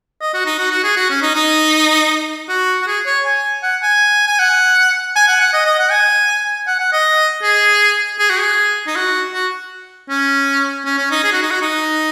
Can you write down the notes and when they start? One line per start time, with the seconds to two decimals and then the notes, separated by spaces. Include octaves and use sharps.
0.21 D#5
0.34 F#4
0.46 D#4
0.59 F#4
0.71 F#4
0.84 G#4
0.96 F#4
1.10 C#4
1.22 D#4
1.35 D#4
2.49 F#4
2.82 F#4
2.87 G#4
3.06 C#5
3.25 G#5
3.63 F#5
3.83 G#5
4.27 G#5
4.39 F#5
5.16 G#5
5.28 F#5
5.40 F#5
5.53 D#5
5.66 D#5
5.79 F#5
5.91 G#5
6.67 F#5
6.79 F#5
6.93 D#5
7.43 G#4
8.19 G#4
8.30 F#4
8.40 G#4
8.87 D#4
8.96 F#4
9.34 F#4
10.10 C#4
10.85 C#4
10.98 C#4
11.11 D#4
11.24 G#4
11.33 F#4
11.42 D#4
11.51 F#4
11.62 D#4